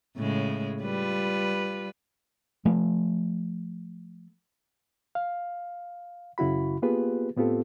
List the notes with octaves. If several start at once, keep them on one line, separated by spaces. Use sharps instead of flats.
A2 C#3 G#3
G3 F4 B4
F3 A3
F5
F#2 C#3 E4 F#4 B5
A#3 B3 F4 G4 G#4 B4
A2 B3 C4 F4 G4 A4